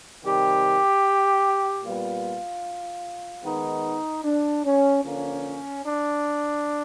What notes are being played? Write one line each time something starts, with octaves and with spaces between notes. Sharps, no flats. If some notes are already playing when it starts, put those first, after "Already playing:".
C3 D#3 G3 G4
A#2 G3 B3 F4
D#3 G#3 B3 D#4
D4
C#4
D3 F3 A#3 C#4
D4